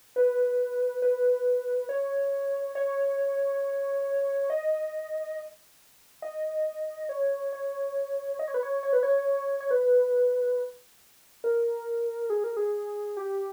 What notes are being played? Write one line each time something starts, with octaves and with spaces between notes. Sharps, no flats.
B4
B4
C#5
C#5
D#5
D#5
C#5
C#5
D#5
C#5
B4
C#5
C#5
B4
C#5
C#5
B4
A#4
G#4
A#4
G#4
G4